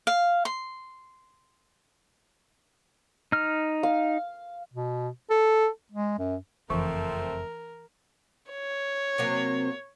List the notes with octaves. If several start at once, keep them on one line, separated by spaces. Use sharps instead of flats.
F5
C6
D#4 F6
F5
B2
A4
G#3
F#2
F#1 F2 E3 F3 A3 C4 A#4
C#5
C3 F#3 A#3